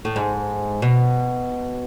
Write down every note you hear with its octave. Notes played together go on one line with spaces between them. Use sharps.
A2
G#2
B2